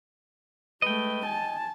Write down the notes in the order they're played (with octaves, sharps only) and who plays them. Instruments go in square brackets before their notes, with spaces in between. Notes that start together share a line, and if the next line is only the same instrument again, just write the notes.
[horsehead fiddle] G#3 A3 [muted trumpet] B4 [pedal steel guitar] D#5 G5
[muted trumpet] G#5 [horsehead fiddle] A5